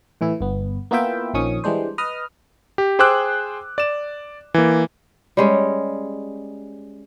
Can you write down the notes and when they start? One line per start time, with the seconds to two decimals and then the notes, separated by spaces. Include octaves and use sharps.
0.21 A2 E3 E4
0.41 G1 B3
0.91 A#3 B3 E4 F4 E5 G5
1.34 A#1 D#3 F3 C#4 C#6 D#6
1.64 E3 G3 G#3 D4 C5
1.98 B4 D#5 D#6 F6
2.78 G4
2.99 G#4 C5 G5 D6 E6 F#6
3.78 D5 E7
4.54 E3 A#3
5.37 G3 G#3 C#4